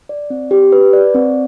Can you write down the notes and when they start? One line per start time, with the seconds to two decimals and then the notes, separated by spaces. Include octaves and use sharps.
0.09 D5
0.30 C4
0.51 G4
0.72 B4
0.93 D5
1.14 C4